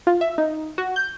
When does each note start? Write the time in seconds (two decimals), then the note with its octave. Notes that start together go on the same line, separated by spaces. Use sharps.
0.07 F4
0.21 E5
0.38 D#4
0.78 F#4
0.96 G6